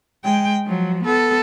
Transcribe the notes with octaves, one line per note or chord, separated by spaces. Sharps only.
G#3 G5
F3 F#3
B3 A4